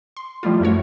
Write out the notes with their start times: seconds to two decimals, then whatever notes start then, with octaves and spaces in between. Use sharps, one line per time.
0.17 C6
0.43 F3 G3 A3 E4 F4
0.60 F#2 A3 F#4 C#5